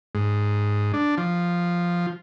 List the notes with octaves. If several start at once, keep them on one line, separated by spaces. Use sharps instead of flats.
G#2
D4
F3